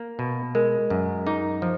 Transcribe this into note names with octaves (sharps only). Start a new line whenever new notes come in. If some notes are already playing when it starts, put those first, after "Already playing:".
Already playing: A#3
B2
G#3 A#4
F#2
D#4 G#4
F3